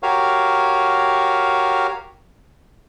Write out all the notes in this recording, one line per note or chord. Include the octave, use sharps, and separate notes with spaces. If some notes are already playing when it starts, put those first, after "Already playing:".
F#4 G4 A#4 C#5 F5